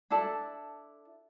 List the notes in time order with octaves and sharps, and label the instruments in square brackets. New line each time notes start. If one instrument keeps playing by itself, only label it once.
[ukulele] D4 E4 A4 A5